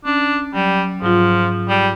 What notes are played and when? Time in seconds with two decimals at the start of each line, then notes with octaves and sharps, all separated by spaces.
0.05 C#4 D4
0.54 F#3 G3
1.02 G#2 F3 F#3 F4
1.69 G3